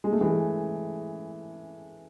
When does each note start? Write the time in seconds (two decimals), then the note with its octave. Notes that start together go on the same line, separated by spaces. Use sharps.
0.04 G#3
0.13 A3
0.21 E3 G#3